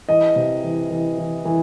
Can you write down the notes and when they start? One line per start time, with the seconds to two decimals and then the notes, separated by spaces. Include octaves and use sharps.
0.09 E3 D#5
0.36 C3
0.64 E3
0.90 E3
1.18 E3
1.45 E3